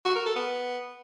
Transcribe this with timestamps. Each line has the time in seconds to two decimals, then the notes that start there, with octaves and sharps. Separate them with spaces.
0.05 F#4
0.15 A#4
0.26 A4
0.36 B3